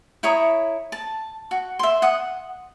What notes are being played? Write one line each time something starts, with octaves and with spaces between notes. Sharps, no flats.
E4 C#5 A#5 D#6
A5
F#4
E5 C6
F#5 D#6